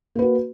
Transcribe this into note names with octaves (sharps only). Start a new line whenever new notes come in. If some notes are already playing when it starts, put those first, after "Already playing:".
A#3 F#4 B4